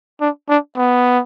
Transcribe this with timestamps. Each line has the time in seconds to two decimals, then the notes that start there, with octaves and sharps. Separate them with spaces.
0.21 D4
0.49 D4
0.77 B3